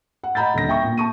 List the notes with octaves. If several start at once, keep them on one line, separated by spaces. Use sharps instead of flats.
F#5
D#5 F#5 A#5 B5 G6 A6
D#1 D3 A#6
E5 G5 C#6
A#2
A5 C#6 D#7